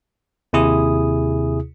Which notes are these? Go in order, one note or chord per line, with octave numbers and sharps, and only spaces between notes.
D#2 C3 E4 G#4 D#6